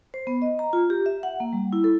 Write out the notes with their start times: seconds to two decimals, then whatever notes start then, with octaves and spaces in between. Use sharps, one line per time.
0.14 C5
0.27 B3
0.42 D#5
0.59 A#5
0.73 F4
0.90 G4
1.06 E5
1.23 F#5
1.40 A#3
1.53 G3
1.73 E4
1.84 A4